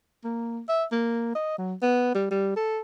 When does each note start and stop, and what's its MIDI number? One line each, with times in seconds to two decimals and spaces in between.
0.24 0.60 58
0.69 0.84 76
0.92 1.32 58
1.35 1.57 75
1.58 1.74 54
1.82 2.11 59
2.15 2.29 55
2.31 2.54 55
2.56 2.81 69